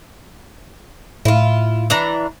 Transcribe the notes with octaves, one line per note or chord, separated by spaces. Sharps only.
A2 E4 F4
E3 D4 A#5